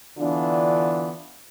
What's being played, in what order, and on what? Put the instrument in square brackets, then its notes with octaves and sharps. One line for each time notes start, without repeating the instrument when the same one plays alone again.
[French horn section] D3 E3 B3 D4 F4